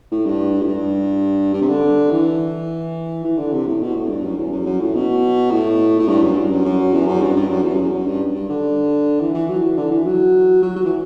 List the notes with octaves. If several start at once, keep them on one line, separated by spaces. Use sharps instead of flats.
A2
G2
A2
G2
G2
C3
D3
E3
E3
D3
C3
A2
B2
A2
G2
F#2
E2
F#2
F#2
A2
B2
A2
A2
G2
F#2
G2
F#2
F#2
E2
F#2
G2
G2
F#2
E2
F#2
G2
G2
D3
E3
E3
F#3
E3
D3
E3
F#3
F#3
F#3
E3